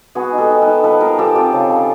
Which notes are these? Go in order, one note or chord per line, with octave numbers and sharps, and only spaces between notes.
B3 F#4 G#4
D#4
G4 A4
D#4
A4 B4
D#4
F3 A4 B4
F3 G#4 A#4
F3 G4 A4
C4 F4 G4
C#3
C#3